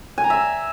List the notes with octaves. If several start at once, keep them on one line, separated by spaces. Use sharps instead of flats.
G#5
A#5
E5